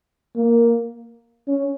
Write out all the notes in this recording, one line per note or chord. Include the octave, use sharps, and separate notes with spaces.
A#3
C#4